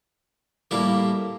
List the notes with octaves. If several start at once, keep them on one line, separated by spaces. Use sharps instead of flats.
A2 G3 A#3 E4 G4